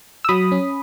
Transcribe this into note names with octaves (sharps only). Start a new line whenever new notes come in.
E6
F#3 B5 D#6
C#4